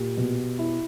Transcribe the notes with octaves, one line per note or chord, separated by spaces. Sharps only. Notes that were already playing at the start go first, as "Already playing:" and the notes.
Already playing: A#2 G4
B2
E4